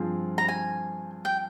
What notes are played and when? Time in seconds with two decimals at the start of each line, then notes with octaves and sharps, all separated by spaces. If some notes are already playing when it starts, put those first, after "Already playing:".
Already playing: G2 F3 C4 F4 G#4
0.38 A#5
0.49 G#5
1.25 G5